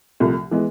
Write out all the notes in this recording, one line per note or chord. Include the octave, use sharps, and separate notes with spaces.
C2 C3 F3 A3
E3 G#3 B3